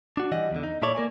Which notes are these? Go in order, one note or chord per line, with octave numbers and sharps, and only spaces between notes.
D4 F#4
E3 G3 D#5 F#5
E2 D3
D#4
A#2 E4 A4 C#5 D5
A#3 A#4 D5 G#5